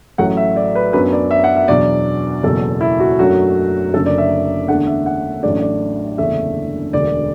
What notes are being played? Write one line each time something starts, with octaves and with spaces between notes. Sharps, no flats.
A1 A2 F#3 A3 F#5
E5
D5
B4
F#2 F#3 B3 D4 B4
D5
E5
F#5
E5
E2 B2 F#3 D4 D5
F#1 E2 B2 F#3 A4
E4
F#4
F#2 F#3 A3 D4 F#4
F#1 F#2 D3 A4
D5
E5
E2 D3 A3 D4 F#5
E5
F#5
A1 A2 F#3 A3 D4 D5
D5
F#1 E2 D3 A3 D4 E5
E1 D2 D3 D5